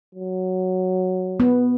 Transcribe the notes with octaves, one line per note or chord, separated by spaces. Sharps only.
F#3
B3